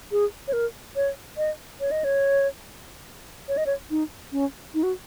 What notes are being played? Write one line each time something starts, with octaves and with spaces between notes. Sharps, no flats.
G#4
C#5
A#4
C#5
D#5
C#5
D#5
C#5
C#5
D#5
C#5
D#4
C#4
D#4
F#4